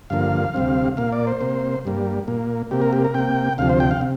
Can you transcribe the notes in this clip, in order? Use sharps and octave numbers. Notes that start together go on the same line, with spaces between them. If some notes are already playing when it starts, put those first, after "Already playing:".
G2 D3 F3 A#3 F5
D2 C3 G3 C4
A#2 A#3 F5
D5
C5
C3 A#3
G2 G3 A#3
A#2 A#3
C3 A#3 G4
A#4
G4
A#4
C3 A#3 G5
D2 C3 F3 F5
C5
G5
F5
C3